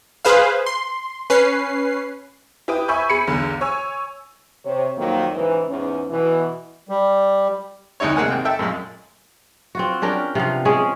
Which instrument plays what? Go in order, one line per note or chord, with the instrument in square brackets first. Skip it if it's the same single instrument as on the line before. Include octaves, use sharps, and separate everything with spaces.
[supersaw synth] G#4 B4 C5 F5
C6
C#4 B4 C7
[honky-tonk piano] E4 G4 B4 G5 D#6
E5 G#5 B5 C#6 G6
G#4 B5 C#7 D#7
B1 E2 D3
C#5 G#5 E6
[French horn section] C3 C#5
F2 D#3 F#3 A#3
G#2 C#3 E3
E2 G#2 C#4
B2 E3
[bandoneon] G3
[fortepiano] D2 G#3 D#4 E4 C#5
C3 G#3 A#3 F#5 G#5
G#1 G5
A4 E5 G5
F#2 A#2 G#3
[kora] C4 F4 F#4
C#4 D4 A#4 G5
C3 F3 B3 F5
G#3 C#4 G#4